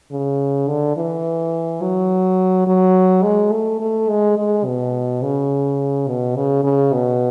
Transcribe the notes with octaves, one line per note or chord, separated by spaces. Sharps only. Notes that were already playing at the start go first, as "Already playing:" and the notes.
C#3
D3
E3
F#3
F#3
G#3
A3
A3
G#3
G#3
B2
C#3
B2
C#3
C#3
B2